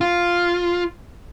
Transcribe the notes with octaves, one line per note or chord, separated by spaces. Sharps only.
F4